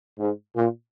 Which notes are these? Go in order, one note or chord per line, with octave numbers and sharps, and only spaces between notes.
G#2
A#2